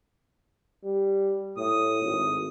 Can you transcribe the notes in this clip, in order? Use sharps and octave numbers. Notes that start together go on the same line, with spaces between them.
G3
A2 D#6
G#1